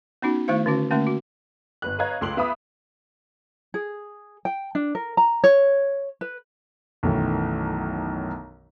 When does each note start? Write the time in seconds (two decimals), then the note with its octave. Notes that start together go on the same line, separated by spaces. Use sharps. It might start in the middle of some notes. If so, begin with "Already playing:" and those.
0.22 B3 C#4 D#4 F#4
0.48 D#3 A3 E4 C5 F5
0.66 D3 C#4 F#4
0.91 D3 A3 A#3 C#4
1.07 F#4
1.82 G1 B4 F#6
1.99 B4 C#5 D#5 F5 A#5 G#6
2.21 C#2 A3 C6 D6 F#7
2.37 B3 E5 F5 B5 D#6
3.74 G#4
4.45 G5
4.75 D4
4.95 A#4
5.17 A#5
5.44 C#5
6.21 B4
7.03 B1 F#2 D#3 E3 A3